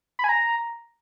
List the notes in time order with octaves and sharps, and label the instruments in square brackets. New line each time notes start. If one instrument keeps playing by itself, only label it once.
[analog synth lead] B5
G#5
A#5